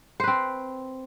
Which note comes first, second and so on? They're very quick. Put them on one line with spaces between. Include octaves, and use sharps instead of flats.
C5 B4 C4